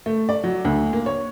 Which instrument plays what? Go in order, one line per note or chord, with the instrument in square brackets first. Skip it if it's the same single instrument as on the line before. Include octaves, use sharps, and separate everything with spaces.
[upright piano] A3
D5
F#3
D2
A#3
C#5